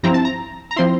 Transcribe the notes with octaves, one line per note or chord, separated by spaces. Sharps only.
G2 F3 C4 E4 A#5
A5
A#5
A#5
F3 C4 E4 C6